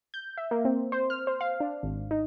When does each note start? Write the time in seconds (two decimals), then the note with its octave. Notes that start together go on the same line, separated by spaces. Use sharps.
0.14 G6
0.37 E5
0.51 A#3
0.65 C4
0.92 C5
1.10 F6
1.27 C5
1.41 F5
1.60 D4
1.83 G#1
2.11 D#4